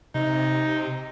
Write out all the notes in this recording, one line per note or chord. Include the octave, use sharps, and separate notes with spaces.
C3 D#4